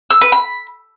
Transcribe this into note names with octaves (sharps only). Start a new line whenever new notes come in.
E6
B4
B5